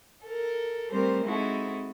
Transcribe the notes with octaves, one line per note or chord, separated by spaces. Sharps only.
A4 A#4
G3 A3 C4 A#4 C5
G#3 C4 D#4 E4 F#4 A4